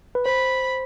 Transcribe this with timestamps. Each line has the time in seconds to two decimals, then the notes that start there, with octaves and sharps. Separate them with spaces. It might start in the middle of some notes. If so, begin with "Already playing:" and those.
0.15 B4
0.25 C5 B5